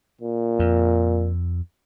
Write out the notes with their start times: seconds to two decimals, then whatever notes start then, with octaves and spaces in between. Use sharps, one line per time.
0.21 A#2
0.59 F2